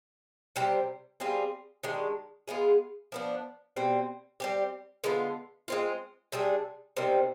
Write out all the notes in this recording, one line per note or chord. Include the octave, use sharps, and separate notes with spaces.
C3 G3 C4 G4
G3 C4 F4 G#4
D#3 G#3 D4 G4
G#3 B3 F4 G#4
F3 B3 D4
B2 G3 C4
G3 C4 G4
D3 G#3 B3 F4
G#3 C4 F4
C3 G3 D4 G#4
C3 D#3 G3 C4